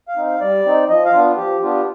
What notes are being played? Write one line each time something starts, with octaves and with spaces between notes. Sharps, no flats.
F5
C4 D#4
F5
G3 D5
C4 D#4
F3 D#5
F5
B3 D4 F4
F3 G4
B3 D4 F4 G4